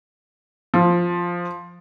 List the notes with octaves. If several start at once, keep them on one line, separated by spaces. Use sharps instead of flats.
F3